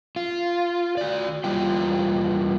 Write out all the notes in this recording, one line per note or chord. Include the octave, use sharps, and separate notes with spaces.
F4
F#4 D5
E2 G3 F4 G5